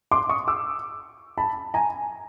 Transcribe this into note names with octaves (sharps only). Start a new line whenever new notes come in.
C6 D6
C#6 D#6
D6 E6
A5 B5
G#5 A#5